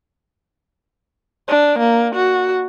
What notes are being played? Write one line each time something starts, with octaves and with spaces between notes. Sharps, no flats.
D4
A#3
F#4